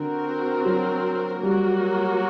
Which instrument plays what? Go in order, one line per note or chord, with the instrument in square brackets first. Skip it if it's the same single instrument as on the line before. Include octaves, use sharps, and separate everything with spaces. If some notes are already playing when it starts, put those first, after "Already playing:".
Already playing: [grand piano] D3 [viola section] C4 F#4 A#4
[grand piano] F#3
[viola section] F#3 A#3 F#4 A#4 [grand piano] G3